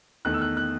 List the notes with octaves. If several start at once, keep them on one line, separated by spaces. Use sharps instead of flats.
E2 D#3 A3 F#6
E6
F#6
F#6